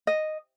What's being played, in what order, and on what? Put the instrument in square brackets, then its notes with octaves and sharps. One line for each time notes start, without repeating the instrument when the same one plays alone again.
[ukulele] D#5